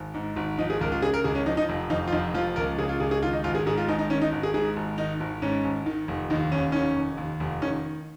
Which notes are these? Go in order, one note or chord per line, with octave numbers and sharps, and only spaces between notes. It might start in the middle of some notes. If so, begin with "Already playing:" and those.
Already playing: G#1
G#2
G#1
F3 D#4
G#4
C#2 A#4
F4
C#3 G#4
A#4
C#2 G#4
C#4
F3 D#4
D#4
F1
F2 D#4
F4
F1 D#4
F3 F4
C#2 A#4
C#3 G#4
F4
C#2 G#4
G#4
D#3 F4
D#4
G#1 F4
G#4
G#2 G#4
F4
G#1 D#4
D#4
D#3 C#4
D#4
G#1
G#4
G#2 G#4
G#1
D#3 D#4
G#1
G#2 C#4
G#1
D#3
F1
D#2 D#4
F1 C#4
D#3 C#4
F1
D#2
F1
D#3 C#4